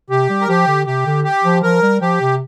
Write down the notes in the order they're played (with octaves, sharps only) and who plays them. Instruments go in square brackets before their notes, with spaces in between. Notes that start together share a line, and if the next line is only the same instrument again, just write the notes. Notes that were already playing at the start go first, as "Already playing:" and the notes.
[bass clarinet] C3 [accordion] G4
[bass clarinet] G3
[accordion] A#4
[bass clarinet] F3 [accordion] G4
[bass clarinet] D3
[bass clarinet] C3 [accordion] G4
[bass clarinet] D3
[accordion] G4
[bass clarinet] F3
[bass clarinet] F3 [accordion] A#4
[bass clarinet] G3
[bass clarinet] F3 [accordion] G4
[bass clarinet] C3